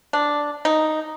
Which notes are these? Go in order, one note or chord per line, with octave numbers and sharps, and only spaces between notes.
D4
D#4